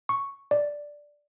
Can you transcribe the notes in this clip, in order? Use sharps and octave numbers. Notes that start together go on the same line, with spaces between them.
C#6
D5